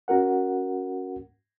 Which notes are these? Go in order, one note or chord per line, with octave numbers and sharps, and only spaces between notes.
C#4 F#4 A#4 F#5